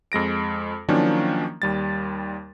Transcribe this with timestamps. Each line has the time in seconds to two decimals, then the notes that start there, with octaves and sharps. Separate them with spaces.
0.12 F2 G#3 A#6 D7
0.89 D#3 F3 F#3 A#3 C#4 D4
1.62 D#2 G3 A6